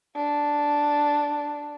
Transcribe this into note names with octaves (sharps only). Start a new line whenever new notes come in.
D4